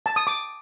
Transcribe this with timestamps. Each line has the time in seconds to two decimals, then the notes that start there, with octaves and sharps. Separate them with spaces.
0.06 A5
0.16 D#6
0.27 D6